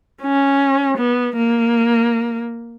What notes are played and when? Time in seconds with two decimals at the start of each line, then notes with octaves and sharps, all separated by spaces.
0.22 C#4
0.98 B3
1.36 A#3